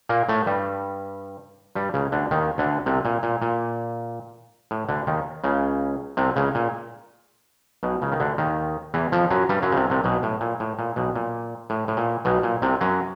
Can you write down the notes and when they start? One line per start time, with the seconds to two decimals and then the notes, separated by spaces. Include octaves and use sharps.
0.09 A#2 A#3
0.29 A2 A3
0.46 G2 G3
1.75 G2 G3
1.94 C#2 C#3
2.12 D2 D3
2.31 D#2 D#3
2.58 D2 D3
2.86 C2 C3
3.05 A#2
3.23 A#2
3.42 A#2
4.71 A2
4.89 D2 D3
5.07 D#2 D#3
5.44 C#2 C#3
6.17 C2 C3
6.36 C#2 C#3
6.55 A#2
7.83 B1 B2
8.02 C#2 C#3
8.12 D#3
8.20 D2 D3
8.38 D#2 D#3
8.94 E2 E3
9.12 F2 F3
9.30 F#2 F#3
9.49 G2 G3
9.62 F#2 F#3
9.72 C#3
9.76 C2 C3
9.90 C2 C3
10.04 B1 B2
10.23 A2
10.41 A#2
10.60 A2
10.79 A#2
10.96 B1 B2
11.15 A#2
11.70 A2
11.88 A2
11.97 A#2
12.25 B1 B2
12.43 A#2
12.62 C2 C3
12.81 F#2 F#3